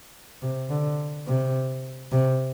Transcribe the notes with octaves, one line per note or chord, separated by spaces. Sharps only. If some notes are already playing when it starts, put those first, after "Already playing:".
C3
D3
C3
C3